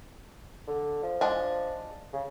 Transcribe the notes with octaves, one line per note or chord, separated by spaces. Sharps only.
D3
F3
G#3 D4 G#5
C#3